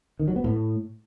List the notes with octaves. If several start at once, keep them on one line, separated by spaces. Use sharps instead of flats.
D#3
F#3
B3
A2